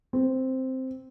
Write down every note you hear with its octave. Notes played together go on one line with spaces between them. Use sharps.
C4